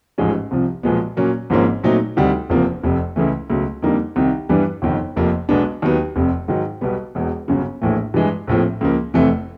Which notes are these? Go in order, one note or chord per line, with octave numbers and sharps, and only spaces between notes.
A1 G#2 F3 G#3 C#4
C2 C3 F3
B1 A#2 F3 G#3 B3
A#2 F#3 A#3 C#4
G#1 G#2 F3 A#3 C#4
A#2 F#3 A3 C4 D#4
D2 C3 D#3 G3
F#1 E2 C3 F3 A#3
F1 F2 C3
C#2 C#3 E3 A3
C#2 B2 F#3 A3
F2 D3 G3 A#3 D#4
C2 C3 D#3
G2 E3 G3 B3 D4
G1 F2 C3 D#3
F1 F2 C3 F3 A#3
B1 B2 G#3 B3 D4
D#2 D#3 F#3 B3
F1 F2 C3
G#2 D#3 F#3
B1 B2 G3 B3
E1 E2 B2
G1 F#2 C#3
A#1 A2 E3 A3
G2 E3 G#3
A#1 A2 F3 A3 C4
C#2 C#3 F3 A#3
F1 F2 C3 E3 A3